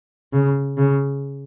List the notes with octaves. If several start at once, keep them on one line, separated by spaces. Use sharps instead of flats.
C#3
C#3